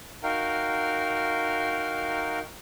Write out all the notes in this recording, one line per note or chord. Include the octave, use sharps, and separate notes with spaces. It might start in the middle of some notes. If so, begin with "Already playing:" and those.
D#4 F#4 A#4 F5 G5